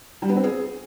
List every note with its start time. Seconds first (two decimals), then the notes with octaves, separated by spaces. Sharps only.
0.22 G3
0.29 B3
0.36 C4
0.44 G#4